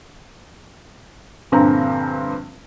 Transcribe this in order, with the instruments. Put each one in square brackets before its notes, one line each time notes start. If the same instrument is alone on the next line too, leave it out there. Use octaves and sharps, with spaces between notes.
[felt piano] A#1 G2 D3 C4 B4 A#5